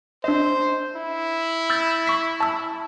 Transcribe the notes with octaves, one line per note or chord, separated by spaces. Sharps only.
D4 C5 D#5
E4
E6 G6 A6
C#6 B6
A5 E6